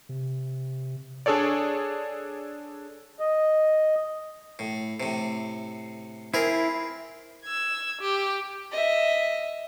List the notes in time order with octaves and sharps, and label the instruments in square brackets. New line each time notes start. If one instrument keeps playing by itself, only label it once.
[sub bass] C3
[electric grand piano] D4 G#4 A4 C#5 D5
[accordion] D#5
[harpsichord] A2
A2 C3
[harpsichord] C4 G#4 A#4 [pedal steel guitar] E4
[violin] E6 G#6
G4
[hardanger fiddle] D#5 E5